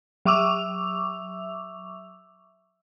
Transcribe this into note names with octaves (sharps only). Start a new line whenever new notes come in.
F#3 E5 C#6 D6 E6 F7